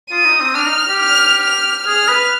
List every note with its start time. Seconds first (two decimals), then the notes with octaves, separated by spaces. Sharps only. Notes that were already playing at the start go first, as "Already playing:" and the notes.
0.11 F4 D#6
0.26 D#4
0.41 C4
0.55 D4 F6
0.66 D#4
0.88 G4
0.99 F6
1.43 F6
1.87 G#4 F6
2.09 B4